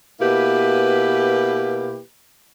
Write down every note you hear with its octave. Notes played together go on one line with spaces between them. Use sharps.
B2 A#3 E4 G4 B4